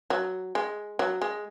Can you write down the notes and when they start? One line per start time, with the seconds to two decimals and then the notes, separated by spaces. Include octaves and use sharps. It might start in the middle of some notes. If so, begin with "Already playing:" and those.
0.10 F#3
0.55 G#3
0.99 F#3
1.22 G#3